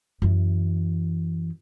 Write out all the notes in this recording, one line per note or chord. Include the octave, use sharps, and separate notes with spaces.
F#2 E3